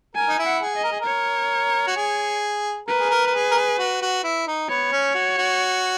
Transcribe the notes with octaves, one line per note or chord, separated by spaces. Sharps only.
A#4 G#5
D#4
E4
F#5
G#4
D#5
A#4
G#4
A#4
C#5
F#4
G#4
A#4 B4
G#4
A#4
A#4
G#4
A#4
G#4
F#4
F#4
E4
D#4
B3 C#5
C#4
F#4
F#4